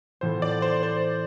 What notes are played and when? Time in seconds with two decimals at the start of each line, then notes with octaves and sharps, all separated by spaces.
0.21 A2 E3 B3 F4 A4 C5
0.42 D5
0.62 C5
0.83 C5